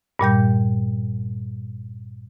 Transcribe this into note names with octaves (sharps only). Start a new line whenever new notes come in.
G2 A#2 G3 G6